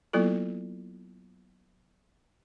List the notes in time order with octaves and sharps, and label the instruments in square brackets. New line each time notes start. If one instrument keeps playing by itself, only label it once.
[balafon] F#3 A#3 B3 E4 F4 A4